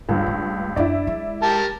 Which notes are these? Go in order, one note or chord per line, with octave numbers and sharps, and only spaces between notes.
C#2 G2 F3
A3
F#2 D4 E4 D5
G#3
G4 A#4 A5